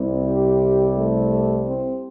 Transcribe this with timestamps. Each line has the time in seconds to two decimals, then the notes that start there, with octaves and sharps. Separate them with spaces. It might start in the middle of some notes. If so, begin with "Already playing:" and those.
Already playing: C2 C3 G3
0.25 G4
0.96 A3
1.65 C4